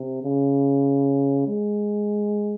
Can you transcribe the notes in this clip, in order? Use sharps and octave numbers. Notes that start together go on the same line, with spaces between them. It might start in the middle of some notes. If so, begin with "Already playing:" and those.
Already playing: C3
C#3
G#3